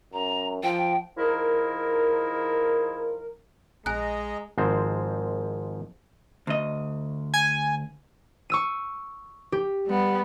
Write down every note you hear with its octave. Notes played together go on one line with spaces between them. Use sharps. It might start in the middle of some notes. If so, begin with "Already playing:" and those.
F#2 A#5
F3 G5
F3 D#4 E4 G#4 A#4
A#1 G#3 D#5 G#5 A#5 F#6
G#1 G#2 F3 G#3 C4 C5
D2 D#5
G#5
C#6 E6 D#7
G4
G3 B3